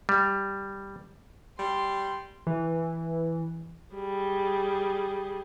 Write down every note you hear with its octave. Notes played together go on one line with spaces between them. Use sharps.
G3
G3 C6
E3
G3 G#4